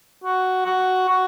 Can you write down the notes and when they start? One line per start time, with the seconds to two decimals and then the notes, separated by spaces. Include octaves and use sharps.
0.24 F#4
0.66 F#4
1.08 F#4